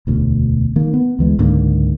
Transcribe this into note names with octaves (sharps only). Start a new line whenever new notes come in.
E1 D2 B2
D#3 A#3
B3
D2 E3 G#3
C#2 G#2 D3 A#3